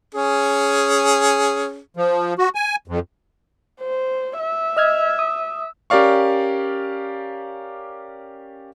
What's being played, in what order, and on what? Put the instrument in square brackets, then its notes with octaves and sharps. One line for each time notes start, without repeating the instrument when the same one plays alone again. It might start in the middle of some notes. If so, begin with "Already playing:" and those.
[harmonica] C#4 G#4
[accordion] F3
F#4
G#5
F2
[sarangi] C5
E5
[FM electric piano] D#5 F6 G#6
D#6
[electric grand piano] C#4 G4 A#4 D5 F5 C#6